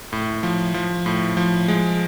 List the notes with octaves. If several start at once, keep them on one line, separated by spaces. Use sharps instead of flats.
A2
F3
F3
A2
F3
G#3